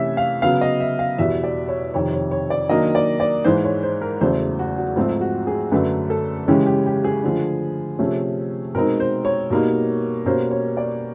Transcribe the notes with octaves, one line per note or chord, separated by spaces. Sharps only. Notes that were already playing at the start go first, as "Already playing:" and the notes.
Already playing: C3 E3 A3 C#4 E5
F5
C#3 F#3 B3 F5
D#5
E5
F5
E2 B2 G3 E5
D5
C#5
F2 C3 D#3 C#5
C#5
C#5
D5
D#3 F#3 A#3 D4 D#5
D5
D5
G#2 E3 G#3 C5
C#5
C5
A#4
E2 C#3 F#3 A3 C5
F#4
F#4
G#2 F3 A3 C4 D#4 F4
F#4
G#4
F#2 D3 F#3 A3 D4 B4
A4
C#3 E3 G#3 C#4 G4
G4
G4
G#4
D3 F3 A3
C3 F3 A3 C#4
B2 G#3 C4 D#4 A#4
C5
C#5
B2 G3 A#3 D#4
B2 G3 A#3 C#4 C5
C#5
D5